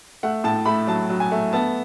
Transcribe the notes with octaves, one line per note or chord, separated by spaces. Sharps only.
A3 F#5
A2 A5
A3 B5
F#3 A5
F#3
G#5
A3
B3 A5